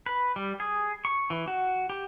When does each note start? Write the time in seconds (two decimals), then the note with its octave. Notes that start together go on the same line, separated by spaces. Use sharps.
0.06 B4
0.36 G3
0.60 G#4
1.05 C#6
1.30 E3
1.48 F#4
1.90 G4